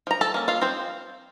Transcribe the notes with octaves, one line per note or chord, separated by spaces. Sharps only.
F3 A#5
A4 A5
A#3 C#4
F4 F5
F3 C4 C5